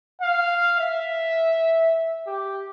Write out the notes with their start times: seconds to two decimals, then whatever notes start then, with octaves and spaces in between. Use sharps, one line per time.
0.22 F5
0.80 E5
2.27 G4